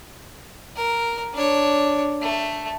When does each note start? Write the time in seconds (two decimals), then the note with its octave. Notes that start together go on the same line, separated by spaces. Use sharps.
0.76 A#4
1.33 D4 C#5
2.22 A3